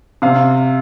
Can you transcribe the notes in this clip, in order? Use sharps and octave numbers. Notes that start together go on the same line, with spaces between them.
C3 F5